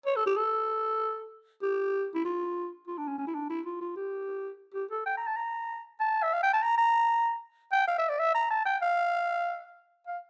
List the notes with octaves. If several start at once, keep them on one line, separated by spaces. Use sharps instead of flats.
C#5
A4
G4
A4
G4
E4
F4
F4
D4
C#4
C#4
E4
D4
E4
F4
F4
G4
G4
A4
G5
A#5
A5
A#5
A5
E5
F5
G5
A5
A#5
A#5
G5
F5
E5
D5
E5
A#5
A5
G5
F5
F5